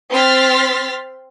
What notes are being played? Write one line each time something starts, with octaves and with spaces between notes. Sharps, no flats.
C4 C6 F6 A6 B6